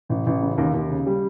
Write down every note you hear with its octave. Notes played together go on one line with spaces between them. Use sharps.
A1
A1
C#3
D#2
D#2
C#3
G3